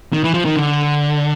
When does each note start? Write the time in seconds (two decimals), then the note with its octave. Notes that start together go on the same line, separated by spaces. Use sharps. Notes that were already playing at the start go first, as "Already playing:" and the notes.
0.13 D#3
0.24 E3
0.34 F3
0.45 D#3
0.56 D3